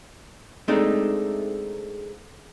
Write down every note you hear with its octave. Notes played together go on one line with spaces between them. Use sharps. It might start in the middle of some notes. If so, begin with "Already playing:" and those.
G#3 A3 C4 D4 D#4